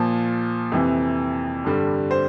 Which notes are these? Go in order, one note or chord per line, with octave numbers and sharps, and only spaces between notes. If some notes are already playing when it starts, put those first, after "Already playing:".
Already playing: A#2 F3 A5
F2 C3 E3
G2 D3 G3
C5